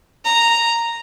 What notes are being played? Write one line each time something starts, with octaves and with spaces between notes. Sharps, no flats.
A#5